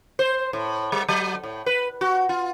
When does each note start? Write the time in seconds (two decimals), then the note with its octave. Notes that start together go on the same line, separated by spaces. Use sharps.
0.19 C5
0.53 A2
0.92 G3
1.08 F#3
1.44 A2
1.66 B4
2.01 F#4
2.29 F4